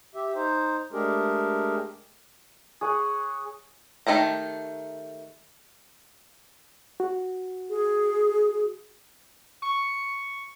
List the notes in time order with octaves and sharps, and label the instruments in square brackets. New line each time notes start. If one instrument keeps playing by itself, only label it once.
[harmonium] G4 E5
D#4 C5
G#3 A3 D4 G4 G#4 A#4
[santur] G#4 C#5 F#5
[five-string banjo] D#3 A3 G4 A#5
[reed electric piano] F#4
[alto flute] G#4
[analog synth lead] C#6